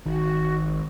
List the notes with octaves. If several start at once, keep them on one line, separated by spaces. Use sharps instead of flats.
G#1 D#3 F#4